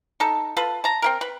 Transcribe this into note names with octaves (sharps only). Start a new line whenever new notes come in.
D#4 A4
F4 A4 B4
A5 A#5
C4 E4 A#4
B4